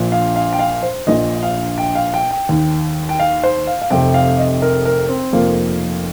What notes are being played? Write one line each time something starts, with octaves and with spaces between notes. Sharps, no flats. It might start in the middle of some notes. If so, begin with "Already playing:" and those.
Already playing: A#1 A#2 F3
F5
F5
G5
F5
C5
A#1 A#2 F3 D#5
F5
G5
F5
G5
G5
D#2 D#3
G5
F5
C5
F5
F5
F1 F2 C3 G5
F5
D#5
A#4
A#4
C4
F1 F2 F3 A#3